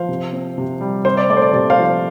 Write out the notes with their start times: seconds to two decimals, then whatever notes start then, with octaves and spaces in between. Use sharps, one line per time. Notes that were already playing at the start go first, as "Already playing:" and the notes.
Already playing: F3 C5 F5
0.09 C3
0.33 C4
0.58 C3
0.81 G3
1.05 C3 C5
1.17 D5
1.29 A3 D5
1.37 C5
1.42 D5
1.53 C3 D5
1.70 C5 F5
1.78 F3